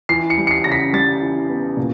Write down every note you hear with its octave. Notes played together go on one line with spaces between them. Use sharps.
E3 C7
C#7
G3
C#7
C7
C#3 A#6
B6
G3 A6
E3
B3
A#2